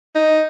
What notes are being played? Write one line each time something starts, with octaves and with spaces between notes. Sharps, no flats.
D#4